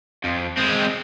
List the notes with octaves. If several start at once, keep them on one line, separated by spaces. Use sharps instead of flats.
F2
G#3 C4